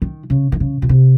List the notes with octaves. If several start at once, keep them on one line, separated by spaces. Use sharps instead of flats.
D#3
C#3
D#3
C#3
A#2
C3